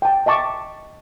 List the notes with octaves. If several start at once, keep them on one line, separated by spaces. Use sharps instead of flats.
G5 A5
D#5 E5 A5 C#6 D6